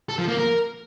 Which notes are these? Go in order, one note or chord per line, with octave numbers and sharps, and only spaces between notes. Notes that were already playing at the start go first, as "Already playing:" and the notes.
A4
F3
A#3
A#4